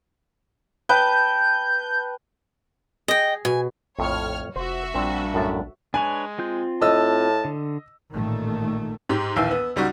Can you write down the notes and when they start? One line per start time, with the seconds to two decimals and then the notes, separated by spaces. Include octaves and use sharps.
0.89 B4 G5 A5 G6
3.08 G#4 D#5 G5
3.45 B2 G#5
3.99 A#1 F2 A2 C#5 F6
4.56 F1 F#4 C5 E5
4.95 A#1 A#2 G3 C4 D4
5.34 F#2 A2 A5
5.94 G#3 D4 B4 C#5 G#5
6.38 C4 F4 G6
6.82 A2 D#5 A5 E6
7.45 D3
8.14 A1 A#2 D#3 A3
9.09 G#2 G4
9.36 A#1 D#2 E3 F5 G5 E6
9.51 B3
9.76 C#2 G3 D#4 F#4